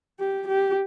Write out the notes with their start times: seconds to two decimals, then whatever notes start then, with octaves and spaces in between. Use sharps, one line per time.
0.20 G4
0.48 G4